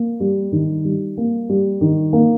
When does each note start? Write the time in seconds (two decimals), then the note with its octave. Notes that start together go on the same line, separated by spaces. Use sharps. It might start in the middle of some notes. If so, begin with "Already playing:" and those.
Already playing: A#3
0.20 G3
0.52 D#3
0.85 G3
1.18 A#3
1.49 G3
1.81 D#3
2.13 A#3